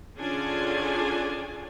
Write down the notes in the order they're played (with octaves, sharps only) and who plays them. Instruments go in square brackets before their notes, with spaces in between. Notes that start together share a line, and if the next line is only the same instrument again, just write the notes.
[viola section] D3 C#4 D4 F4 G#4 G#5